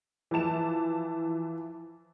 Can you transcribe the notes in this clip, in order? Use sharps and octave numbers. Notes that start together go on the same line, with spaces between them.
E3 F3 E4 A5 E7